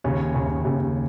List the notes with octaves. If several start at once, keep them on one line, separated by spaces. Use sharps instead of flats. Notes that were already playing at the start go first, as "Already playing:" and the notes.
D#2 C#3 C#4
D#2 C#3
D#2 C#3